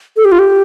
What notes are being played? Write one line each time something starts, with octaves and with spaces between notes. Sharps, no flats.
A4
G4
F4
G4